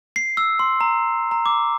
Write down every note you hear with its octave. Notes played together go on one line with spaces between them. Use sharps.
C7
E6
C6
A#5
A#5
D6